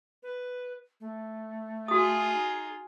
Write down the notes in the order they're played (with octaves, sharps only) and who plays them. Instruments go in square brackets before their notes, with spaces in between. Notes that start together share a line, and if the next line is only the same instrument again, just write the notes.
[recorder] B4
A3
[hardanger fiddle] F4 G#4 [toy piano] F#4 D#6
[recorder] D#4